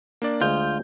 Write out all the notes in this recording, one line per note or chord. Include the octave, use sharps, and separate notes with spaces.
A#3 D4 D5
D2 G#3 F4 D#5 G6